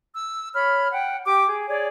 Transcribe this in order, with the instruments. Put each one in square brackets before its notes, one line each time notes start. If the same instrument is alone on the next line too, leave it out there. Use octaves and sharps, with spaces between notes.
[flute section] E6
C#5 B5 F6
F#5 G5
G4 G5 D6
G#4
G#4 C#5 D5